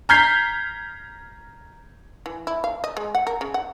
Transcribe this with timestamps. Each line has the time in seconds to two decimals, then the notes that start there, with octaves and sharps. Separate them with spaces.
0.09 A#5 F6 G6 G#6 B6 C7
2.26 E3
2.47 E4
2.64 F5
2.84 D#5
2.97 G#3
3.15 F#5
3.27 A#4
3.41 C#3
3.54 F#5